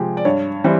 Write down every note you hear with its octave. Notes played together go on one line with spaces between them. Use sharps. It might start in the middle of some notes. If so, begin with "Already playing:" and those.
Already playing: C3 F3 G#3 G4 G#4
D5
G2 C#5
E3 G3 C4